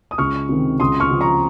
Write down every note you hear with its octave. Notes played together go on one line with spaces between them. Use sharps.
D#6
C#2 C#6 F6
C3 D#3
C#2 C6 D#6
C#6 F6
C#3 F3
A#5 C#6